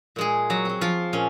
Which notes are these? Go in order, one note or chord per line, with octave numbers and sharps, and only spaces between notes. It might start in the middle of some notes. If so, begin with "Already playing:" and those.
A#2 G#3 G#4
F#3 F#4
F#3 C4
F3 F4
A#2 C#4